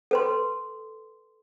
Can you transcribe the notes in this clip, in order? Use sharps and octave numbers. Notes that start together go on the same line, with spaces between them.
A4 B4 C6